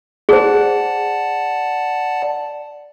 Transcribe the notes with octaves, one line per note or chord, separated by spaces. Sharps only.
G#4 C5 D5 F#5 A5